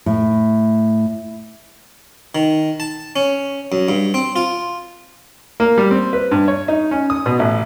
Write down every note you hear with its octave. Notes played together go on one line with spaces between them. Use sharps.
A2
D#3
A5
C#4
F#2
G2
C4
F4
A#3
G3
C4
B4
G2
C#5
D#4
C#4
D#6
B2
A1